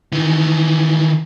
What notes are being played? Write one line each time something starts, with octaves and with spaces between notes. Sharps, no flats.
D#3 E3